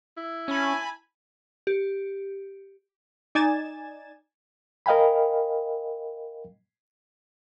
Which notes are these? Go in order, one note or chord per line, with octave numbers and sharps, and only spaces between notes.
E4
C#4 G#5 A5 B5
G4
D#4 D5 G#5 G#6 A6 E7
A#4 D#5 F5 G5 G#5 B5